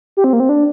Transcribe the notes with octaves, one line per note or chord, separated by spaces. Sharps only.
G4
C4
A#3
C4
D4